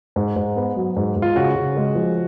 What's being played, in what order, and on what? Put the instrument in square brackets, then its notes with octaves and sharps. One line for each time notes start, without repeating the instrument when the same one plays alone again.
[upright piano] G#2
G#2
B3
F#3
G#2
G#2
[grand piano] F4
[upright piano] C#3 [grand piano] F#4
[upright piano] C#3
G#3
F3